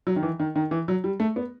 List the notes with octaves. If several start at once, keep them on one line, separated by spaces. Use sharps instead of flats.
F#3
D#3
E3
D#3
D#3
E3
F#3
G3
A3
B3